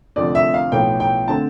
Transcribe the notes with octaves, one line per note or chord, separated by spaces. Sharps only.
F1 F2 D3 F3 A3 D5
E5
F5
B1 A2 F3 B3 G5
G5
D3 A3 C4 A5